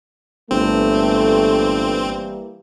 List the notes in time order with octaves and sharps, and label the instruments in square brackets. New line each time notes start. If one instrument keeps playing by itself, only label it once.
[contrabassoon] G1 [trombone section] E3 G3 A#3 [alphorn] A3 [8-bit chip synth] C4